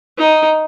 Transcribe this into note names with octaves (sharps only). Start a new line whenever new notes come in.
D#4